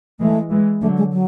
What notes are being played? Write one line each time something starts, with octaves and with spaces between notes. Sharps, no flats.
E3 G#3 A3
E3 G#3
D3 F#3 A3
G#3
F#3